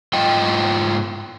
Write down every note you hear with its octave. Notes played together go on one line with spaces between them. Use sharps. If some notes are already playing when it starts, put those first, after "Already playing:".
G#2 F4 D#5 G5